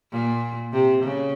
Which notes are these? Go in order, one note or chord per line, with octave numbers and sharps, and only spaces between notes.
A#2
C3
C#3